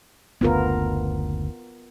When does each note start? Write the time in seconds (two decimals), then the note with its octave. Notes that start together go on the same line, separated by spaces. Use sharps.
0.41 F#1 D2 B3 F4 A#4